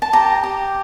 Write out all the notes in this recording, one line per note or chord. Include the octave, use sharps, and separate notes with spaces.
A5
G4 A#5
G4